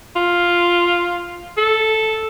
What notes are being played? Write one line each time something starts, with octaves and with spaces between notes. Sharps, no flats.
F4
A4